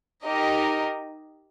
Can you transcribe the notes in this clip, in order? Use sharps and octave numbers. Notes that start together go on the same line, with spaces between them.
D#4 G4 A#4 D#5